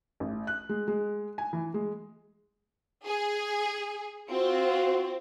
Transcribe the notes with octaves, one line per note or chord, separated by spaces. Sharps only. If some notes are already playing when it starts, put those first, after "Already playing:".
A1
F#6
G#3
G#3
G#5
E3
G#3
G#4
C4 F4 F#4